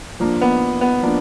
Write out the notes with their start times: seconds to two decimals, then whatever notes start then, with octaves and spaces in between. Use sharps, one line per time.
0.20 F3 A#3 D4
0.41 B3
0.81 B3
1.02 F3 A#3 D4